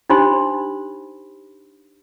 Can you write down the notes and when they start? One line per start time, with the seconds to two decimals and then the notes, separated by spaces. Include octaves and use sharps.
0.10 D4 D#4 G4 C5 B5 C6